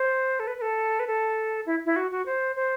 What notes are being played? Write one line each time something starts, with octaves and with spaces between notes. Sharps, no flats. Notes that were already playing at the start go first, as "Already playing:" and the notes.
Already playing: C5
A4
B4
B4
A4
B4
A4
E4
E4
F#4
F#4
C5
C5